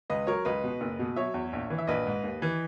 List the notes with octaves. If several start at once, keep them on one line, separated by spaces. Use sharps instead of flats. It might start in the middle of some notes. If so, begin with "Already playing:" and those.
C#2 B4 D#5
F#3 A#4 C#5
C#2 B4 D#5
B2
F#1
B2
F#3 C#5 E5
E2
A#1
E3
E5
A#1 B4 D#5
G#2
D#2
E3